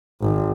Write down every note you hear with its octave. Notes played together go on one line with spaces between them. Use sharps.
G#1